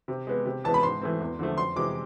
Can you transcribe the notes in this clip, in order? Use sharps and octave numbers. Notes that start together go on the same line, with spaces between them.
C3
G#3 B3
C3
E3 G#3 B3 A5
B5
G#2 C6
E3 A3 C4
E2
D3 F3 A3
F2 C6
C3 E3 G#3 D6